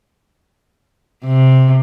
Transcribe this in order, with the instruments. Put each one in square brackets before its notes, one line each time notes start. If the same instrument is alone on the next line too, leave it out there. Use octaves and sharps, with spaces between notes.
[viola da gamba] C3